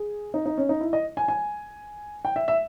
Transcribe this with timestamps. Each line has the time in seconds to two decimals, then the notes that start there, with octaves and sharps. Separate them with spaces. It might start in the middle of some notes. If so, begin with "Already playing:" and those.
Already playing: G#4
0.34 D#4
0.46 D#4
0.58 C#4
0.69 D#4
0.81 E4
0.93 D#5
1.17 G#5
1.28 G#5
2.25 G5
2.36 E5
2.48 E5